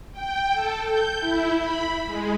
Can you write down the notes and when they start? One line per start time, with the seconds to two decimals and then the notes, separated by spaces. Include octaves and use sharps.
0.12 G5
0.53 A4
0.83 G6
1.20 E4
1.55 B5
2.06 G#3